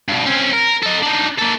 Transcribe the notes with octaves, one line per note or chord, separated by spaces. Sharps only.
G2 B2
C4 C#4
A#4
A4 D#5
D4 D#4
A#3 A4